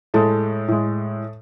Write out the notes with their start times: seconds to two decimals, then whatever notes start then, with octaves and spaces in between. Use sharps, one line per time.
0.14 A2 G#3 A4
0.68 A2 G#3